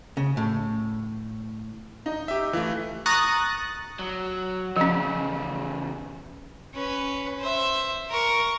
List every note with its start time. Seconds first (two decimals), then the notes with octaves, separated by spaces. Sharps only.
0.17 C#3
0.37 A2
2.06 D#4
2.28 G4 E5
2.53 E3 A3 F4
3.06 A#5 C#6 D#6 F#6 A6 A#6
3.99 F#3
4.76 E2 C#3 F3 C#4
6.74 C#4 B4
7.40 C5 E5
8.09 A#4 C#6